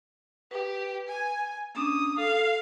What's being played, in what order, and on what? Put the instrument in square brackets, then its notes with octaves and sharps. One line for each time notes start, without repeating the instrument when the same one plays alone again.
[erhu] G4 [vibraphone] B4
[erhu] G#5
[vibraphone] A#3 C#4 D4 [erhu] D#6
[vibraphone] A4 [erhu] F5